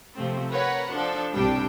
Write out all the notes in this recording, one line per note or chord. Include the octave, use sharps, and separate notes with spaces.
C3 F3 A3 C4
A#4 B4 C#5 F#5
F3 D4 A4
C2 C3 G3 D4 G5